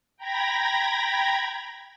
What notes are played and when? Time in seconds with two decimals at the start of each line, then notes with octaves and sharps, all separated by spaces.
0.17 G5 A#5 B5 G#6 A#6